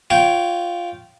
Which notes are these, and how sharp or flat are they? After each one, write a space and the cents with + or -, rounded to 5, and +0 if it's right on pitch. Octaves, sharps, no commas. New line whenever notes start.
F4 +0 C#5 +0 G5 -15